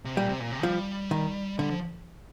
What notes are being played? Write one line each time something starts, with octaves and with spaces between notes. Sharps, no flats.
C3
A#2 G3
C3
A#2
C3
F3 G3
D#3
D3 G3
F3